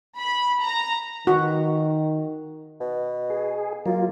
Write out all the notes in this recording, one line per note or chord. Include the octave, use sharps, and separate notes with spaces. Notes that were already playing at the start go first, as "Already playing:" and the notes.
B5
A#5
D#3 F#4
B2
G#4
F#3 A#3 F4